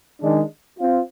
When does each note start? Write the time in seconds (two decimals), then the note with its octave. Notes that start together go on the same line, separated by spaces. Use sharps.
0.21 D#3 G#3 D4
0.79 C4 F4